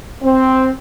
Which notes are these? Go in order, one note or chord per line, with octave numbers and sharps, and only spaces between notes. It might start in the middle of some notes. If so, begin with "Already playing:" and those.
C4